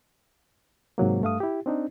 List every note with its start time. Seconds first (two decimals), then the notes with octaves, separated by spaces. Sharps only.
0.98 G#2 C3 F#3 A#3
1.22 G2 A3 F5 D#6
1.40 E4 G4
1.66 C4 D4 D#4